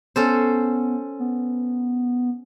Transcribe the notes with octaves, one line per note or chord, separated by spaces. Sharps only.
B3 C#4 A4 C5
B3